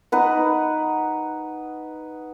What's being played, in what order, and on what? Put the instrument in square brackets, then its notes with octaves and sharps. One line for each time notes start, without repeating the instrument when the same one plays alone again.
[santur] D#4 B4 F#5